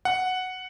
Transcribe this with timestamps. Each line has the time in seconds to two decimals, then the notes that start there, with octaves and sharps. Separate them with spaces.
0.05 F#5